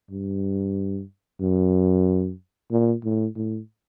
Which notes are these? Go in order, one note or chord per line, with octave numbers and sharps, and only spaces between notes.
G2
F#2
A#2
A2
A2